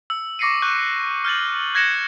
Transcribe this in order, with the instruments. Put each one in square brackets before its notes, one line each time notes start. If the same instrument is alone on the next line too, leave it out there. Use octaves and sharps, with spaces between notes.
[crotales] E6
C#6 D6 A#6 C7 C#7 D#7
C#6 F#6 G6 D#7
F6 G6 A6 F#7
F#6 G#6 A#6 C#7 E7 F#7